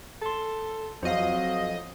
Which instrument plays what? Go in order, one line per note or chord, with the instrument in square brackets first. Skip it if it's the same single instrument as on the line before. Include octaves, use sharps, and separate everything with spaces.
[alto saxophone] A4 [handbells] A5 C6
[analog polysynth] F2 D#5 [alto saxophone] F#3 [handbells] C5 F5